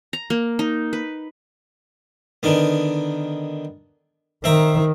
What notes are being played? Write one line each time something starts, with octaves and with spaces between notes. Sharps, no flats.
A#5
A#3
D#4
B4
D3 D#3 B3
D#3 C4 E5 A#5